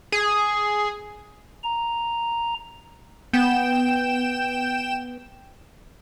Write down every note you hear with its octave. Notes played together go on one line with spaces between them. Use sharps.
G#4
A#5
B3 G5 E7